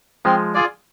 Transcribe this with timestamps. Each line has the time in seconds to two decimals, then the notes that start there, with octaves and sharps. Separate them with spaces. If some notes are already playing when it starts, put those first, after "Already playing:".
0.25 F3 G#3 C4
0.54 F4 G#4 D5